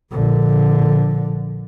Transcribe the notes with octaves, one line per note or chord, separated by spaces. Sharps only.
A#1 D3